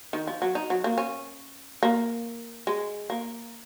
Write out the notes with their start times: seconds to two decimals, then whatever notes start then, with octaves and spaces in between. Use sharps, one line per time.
0.13 D#3
0.27 F3
0.42 F#3
0.55 D#4
0.70 F#3
0.84 A#3
0.98 C#4
1.83 A#3
2.67 G#3
3.10 A#3